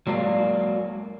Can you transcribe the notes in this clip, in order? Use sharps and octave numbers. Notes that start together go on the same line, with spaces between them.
F#3 G#3 A#3 D5 F5